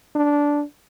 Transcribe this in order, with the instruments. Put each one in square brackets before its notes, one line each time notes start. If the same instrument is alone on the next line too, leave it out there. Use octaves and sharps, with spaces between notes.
[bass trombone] D4